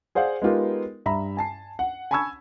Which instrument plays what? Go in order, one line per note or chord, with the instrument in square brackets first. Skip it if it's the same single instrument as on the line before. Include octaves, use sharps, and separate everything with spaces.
[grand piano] G#4 C5 D5 F5 F#5
G#3 B3 D#4 F4 G4 A#4
G2 E5 A#5 B5
G#5 A5 C7
F#5
G#5 A5 B5 C#6 E6 G#6